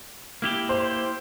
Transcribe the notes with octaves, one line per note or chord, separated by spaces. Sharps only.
A#3 E4 G4
C5